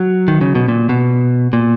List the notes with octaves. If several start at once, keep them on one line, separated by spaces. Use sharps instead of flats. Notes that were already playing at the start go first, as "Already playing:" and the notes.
Already playing: F#3
D#3
C#3
B2
A#2
B2
A#2